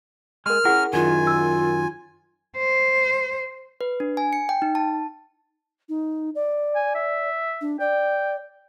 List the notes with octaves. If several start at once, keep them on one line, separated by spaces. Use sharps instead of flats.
G#3 A#4 C6 F6
C#4 E4 G#4 A#4 F#5
F#2 D#3 F4 G#5
E6
C5
B4
D4
G#5
C#7
G5
D#4
A5
D#4
D5
G#5
E5
D4
D5 G5